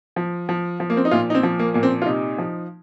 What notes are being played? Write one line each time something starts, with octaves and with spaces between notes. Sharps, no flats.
F3
F3
F3
A#3
C4
D#4
A#2 F4
D#4
C4
F3
A#3
A#2 A#3
C4
F4
C3 D#4
F3